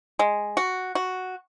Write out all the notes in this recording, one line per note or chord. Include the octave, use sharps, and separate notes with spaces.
G#3
F#4
F#4